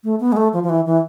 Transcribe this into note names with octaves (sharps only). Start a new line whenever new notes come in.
A3
B3
G#3
A3
F3
F3
E3
E3